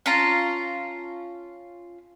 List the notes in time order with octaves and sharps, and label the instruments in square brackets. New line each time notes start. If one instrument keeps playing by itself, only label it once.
[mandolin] C#4 F4 A5 A#5